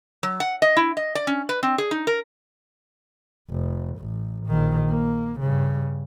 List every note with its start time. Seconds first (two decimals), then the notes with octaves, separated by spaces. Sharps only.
0.23 F#3
0.40 F#5
0.62 D#5
0.77 E4
0.97 D#5
1.15 D5
1.27 C#4
1.49 B4
1.63 C4
1.78 G#4
1.91 D#4
2.07 A#4
3.50 F1
3.99 A1
4.47 A#1 D#3
4.90 A#3
5.40 G2 C#3